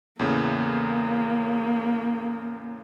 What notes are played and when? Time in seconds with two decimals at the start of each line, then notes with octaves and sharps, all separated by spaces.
0.19 E2 A2 C#3 A#3